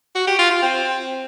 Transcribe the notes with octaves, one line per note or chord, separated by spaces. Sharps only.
F#4
G4
F4
F4
C4